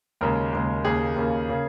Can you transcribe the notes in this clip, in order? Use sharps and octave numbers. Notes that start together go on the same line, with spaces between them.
D#2 C#3 G#3 A#4
D#2 C#3 G#3
D#2 C#3 A#3 G#4
D#2 C#3 A#3
C#3 A#3